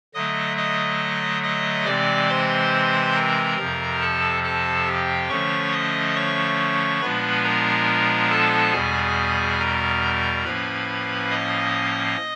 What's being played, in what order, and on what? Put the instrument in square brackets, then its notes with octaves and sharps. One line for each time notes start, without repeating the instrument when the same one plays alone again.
[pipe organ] D3 F#3 A3 D#5 D#6
D#5 D#6
D#5 D#6
C3 E3 G#3 C4 D5 D6
C5 C6
A#4 A#5
F2 C3 F3
A4 A5
A4 A5
G4 G5
D3 F3 A3 C#4 C#5 C#6
D#5 D#6
C#5 C#6
A#2 F3 G#3 B3 D4 B4 B5
A#4 A#5
A4 A5
E2 B2 G3 G#4 G#5
A#4 A#5
A2 F3 A#3 C#4 B4 B5
D#5 D#6